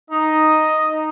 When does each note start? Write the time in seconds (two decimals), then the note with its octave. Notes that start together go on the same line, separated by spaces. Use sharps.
0.10 D#4 D#5
0.90 D#4